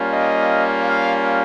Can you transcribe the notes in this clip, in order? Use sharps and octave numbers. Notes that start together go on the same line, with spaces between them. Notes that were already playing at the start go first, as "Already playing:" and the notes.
Already playing: G3 A#3 C#4 F4
D#5
F5